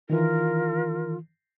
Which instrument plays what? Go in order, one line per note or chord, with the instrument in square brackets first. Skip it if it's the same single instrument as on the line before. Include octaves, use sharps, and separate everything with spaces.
[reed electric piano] D#3 E3 [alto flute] F4 [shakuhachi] A#4